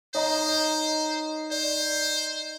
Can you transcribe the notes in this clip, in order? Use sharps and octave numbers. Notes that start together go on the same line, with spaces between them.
D#4 C5 C#5 D#5 A#5
C5 D5